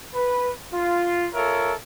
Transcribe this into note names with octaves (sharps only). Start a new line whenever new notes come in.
B4
F4
F4 A4 A#4 C#5 E5